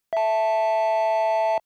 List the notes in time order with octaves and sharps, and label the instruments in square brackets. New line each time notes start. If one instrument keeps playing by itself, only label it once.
[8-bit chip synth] E5 A5